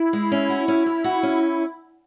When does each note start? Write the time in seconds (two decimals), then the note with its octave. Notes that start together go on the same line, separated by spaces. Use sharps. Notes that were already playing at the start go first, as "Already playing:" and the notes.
Already playing: E4
0.13 G#3
0.32 C#4
0.49 F#4
0.68 C#4
0.86 C#4
1.04 F#4
1.23 C#4